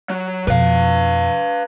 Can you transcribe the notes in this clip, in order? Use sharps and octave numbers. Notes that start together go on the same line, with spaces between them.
F#3
F2 B2 B4 F5